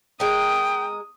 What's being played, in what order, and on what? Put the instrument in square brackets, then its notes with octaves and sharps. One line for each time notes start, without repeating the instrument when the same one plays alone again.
[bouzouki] G#3 A#4 [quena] G5 [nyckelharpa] D#6